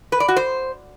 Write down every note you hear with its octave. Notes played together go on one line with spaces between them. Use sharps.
B4
D5
F#4
C5